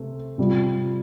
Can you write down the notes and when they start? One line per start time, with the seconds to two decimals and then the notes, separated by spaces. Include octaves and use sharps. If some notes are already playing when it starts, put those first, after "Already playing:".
Already playing: C3 A3 C4
0.38 C3 G3 F4